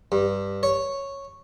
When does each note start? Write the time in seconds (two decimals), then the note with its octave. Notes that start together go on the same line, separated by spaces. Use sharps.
0.12 G2
0.63 C#5